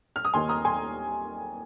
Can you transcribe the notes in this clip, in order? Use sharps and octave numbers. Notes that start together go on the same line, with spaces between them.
F6
D#6
D#2 D#3 A#3 D#4 G#5 C6
A#5 D#6
G#5 C6